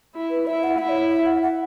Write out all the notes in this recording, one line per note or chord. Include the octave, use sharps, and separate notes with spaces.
E4
B4
E4 E5
F#5
E4 E5
C#5
E5
F#5
F#5